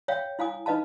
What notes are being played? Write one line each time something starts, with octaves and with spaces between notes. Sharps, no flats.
C#5 E5 F5 G5
E4 F5 G#5 D#6
D#4 B4 D#5 F5 A5